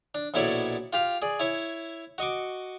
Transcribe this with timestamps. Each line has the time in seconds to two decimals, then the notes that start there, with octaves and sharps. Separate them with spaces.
0.15 D4
0.34 A#1 B2 E4 A4 C#5 D5
0.93 F4 G4 F5
1.22 G#4 D5
1.40 E4 C#5
2.18 F#4 D#5 C#6 D6